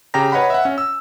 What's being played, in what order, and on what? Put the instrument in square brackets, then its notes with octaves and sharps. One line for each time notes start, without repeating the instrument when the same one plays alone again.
[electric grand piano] C#3 G4 G5 A#5 A#6
B4 C#5 D#5 F#5 B5
E5 F#5
C#4
E6